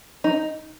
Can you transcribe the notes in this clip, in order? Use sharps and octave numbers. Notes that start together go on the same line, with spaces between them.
D#4